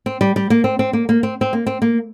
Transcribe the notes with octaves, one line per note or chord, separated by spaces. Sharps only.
C4
G3
G3
A#3
C4
C4
A#3
A#3
C4
C4
A#3
C4
A#3